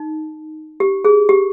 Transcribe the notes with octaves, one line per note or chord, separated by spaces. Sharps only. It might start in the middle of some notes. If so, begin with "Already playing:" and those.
Already playing: D#4
G4
G#4
G4